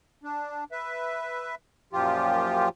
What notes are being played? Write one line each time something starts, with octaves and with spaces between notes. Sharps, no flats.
D4
B4 E5
F#2 A#2 F3 F4 G4